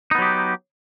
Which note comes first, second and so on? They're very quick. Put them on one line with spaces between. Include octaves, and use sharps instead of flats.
D#4 B3 F#3 G4